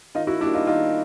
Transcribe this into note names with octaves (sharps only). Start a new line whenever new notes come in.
D#3 D#4 F4
E4 F#4
G3 A#3 D4 E4
D#4 F4
D#3 D#4 F4